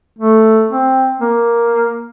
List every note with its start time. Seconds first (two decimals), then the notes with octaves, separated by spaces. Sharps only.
0.19 A3
0.71 C4
1.21 A#3